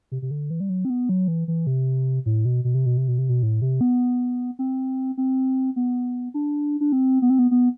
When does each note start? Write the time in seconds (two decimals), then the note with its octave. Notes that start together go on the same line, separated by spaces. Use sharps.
0.12 C3
0.22 C3
0.31 D3
0.50 E3
0.60 G3
0.69 F#3
0.85 C4
0.90 B3
1.09 F#3
1.28 E3
1.48 E3
1.67 C3
2.26 A2
2.45 B2
2.64 B2
2.75 C3
2.86 B2
2.97 C3
3.08 B2
3.18 C3
3.29 B2
3.43 A2
3.62 C3
3.81 B3
4.59 C4
5.18 C4
5.76 B3
6.34 D4
6.81 D4
6.92 C4
7.22 B3
7.30 C4
7.39 B3
7.51 B3